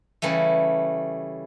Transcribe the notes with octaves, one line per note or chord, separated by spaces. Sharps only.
C#3 E3 G3 A3